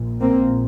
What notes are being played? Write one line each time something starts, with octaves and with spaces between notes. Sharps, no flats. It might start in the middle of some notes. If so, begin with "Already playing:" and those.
Already playing: A#1 A#2
A#3 C4